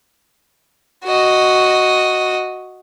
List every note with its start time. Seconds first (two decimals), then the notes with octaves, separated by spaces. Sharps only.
1.04 F#4 D#5